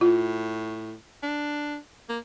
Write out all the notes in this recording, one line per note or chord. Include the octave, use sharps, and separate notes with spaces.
A2 F4
D4
A#3